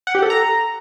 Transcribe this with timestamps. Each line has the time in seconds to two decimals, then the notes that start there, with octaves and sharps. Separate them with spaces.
0.07 F#5
0.15 G4
0.22 A4
0.30 A#5